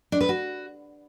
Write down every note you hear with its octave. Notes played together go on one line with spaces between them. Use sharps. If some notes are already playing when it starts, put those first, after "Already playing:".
D4
B4
F#4